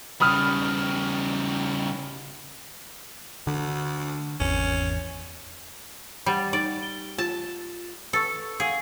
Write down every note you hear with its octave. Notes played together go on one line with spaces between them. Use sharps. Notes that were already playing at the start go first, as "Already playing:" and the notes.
C#3 G3 B5 D#6 F6
D2 D3
G#1 E2 C#4
G3 F#5 A6
D#4 D5
G7
F4 A5
A4 B4 C#6
G#4 F5 F#5